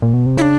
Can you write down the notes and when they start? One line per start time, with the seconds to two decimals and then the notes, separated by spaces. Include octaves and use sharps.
0.02 A#2
0.14 B2
0.26 C3
0.37 C#3 E4
0.42 D4